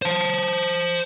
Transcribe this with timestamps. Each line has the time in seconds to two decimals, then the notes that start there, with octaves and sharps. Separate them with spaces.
0.02 C5 A5